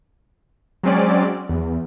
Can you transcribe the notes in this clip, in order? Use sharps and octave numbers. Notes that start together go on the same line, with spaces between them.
F#3 G#3 C4 C#4 D5
E2